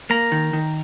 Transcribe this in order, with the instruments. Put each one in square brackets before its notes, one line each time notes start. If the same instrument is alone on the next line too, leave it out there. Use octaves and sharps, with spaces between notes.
[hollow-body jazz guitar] A#3 [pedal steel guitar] A#5
[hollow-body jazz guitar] D#3
D#3